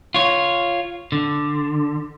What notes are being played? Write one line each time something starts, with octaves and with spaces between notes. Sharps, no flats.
F4 C#5
D3